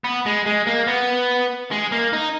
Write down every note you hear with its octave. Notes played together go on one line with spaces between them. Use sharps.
B3
G#3
G#3
A#3
B3
G#3
A#3
D#4